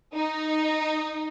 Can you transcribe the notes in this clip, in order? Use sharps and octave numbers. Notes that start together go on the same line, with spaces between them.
D#4